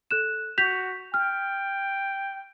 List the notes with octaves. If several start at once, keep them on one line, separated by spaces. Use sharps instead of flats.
A4 F#6 E7
F#4 G6 B6 F7
G5 F6